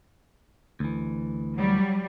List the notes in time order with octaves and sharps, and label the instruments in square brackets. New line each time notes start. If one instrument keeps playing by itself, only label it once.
[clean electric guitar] D2 E3
[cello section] F#3 G3